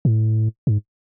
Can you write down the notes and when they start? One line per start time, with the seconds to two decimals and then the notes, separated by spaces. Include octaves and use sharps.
0.05 A2
0.67 G#2